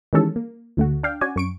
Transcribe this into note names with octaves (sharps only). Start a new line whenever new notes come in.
D#3 E3 G3 G#3 C#4 A4
A#3
D2 A3 F#4
D4 F5 G5
C#4 F#4 D5 G#5
F#2 C#6 D7